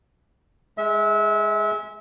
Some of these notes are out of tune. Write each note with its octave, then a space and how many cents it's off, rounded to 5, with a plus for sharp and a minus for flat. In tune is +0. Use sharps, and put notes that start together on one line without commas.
G#3 +0 E5 -30